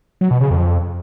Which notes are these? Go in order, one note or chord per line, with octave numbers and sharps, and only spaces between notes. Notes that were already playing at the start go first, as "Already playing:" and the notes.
F#3
B2
C#3
F2